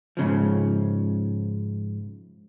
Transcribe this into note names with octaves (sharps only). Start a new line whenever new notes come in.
G#2 C#3 F3